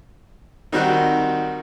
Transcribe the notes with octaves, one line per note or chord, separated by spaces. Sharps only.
D#3 G3 C4 D#4 F#4 F#6